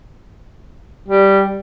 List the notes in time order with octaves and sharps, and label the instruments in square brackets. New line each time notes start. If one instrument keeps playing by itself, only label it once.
[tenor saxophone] G3